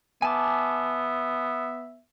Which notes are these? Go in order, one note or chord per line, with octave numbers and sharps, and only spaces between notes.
B3 E5 G#5 A5 D6